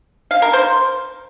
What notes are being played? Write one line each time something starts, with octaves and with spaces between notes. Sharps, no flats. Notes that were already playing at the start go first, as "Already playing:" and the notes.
F5
A#4
C5